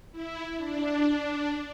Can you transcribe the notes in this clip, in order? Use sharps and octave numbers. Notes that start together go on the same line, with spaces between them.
E4
D4